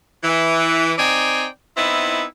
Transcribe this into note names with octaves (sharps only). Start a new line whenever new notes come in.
E3
C4 D#4 D5 G5 G#5
B3 C4 D#4 E4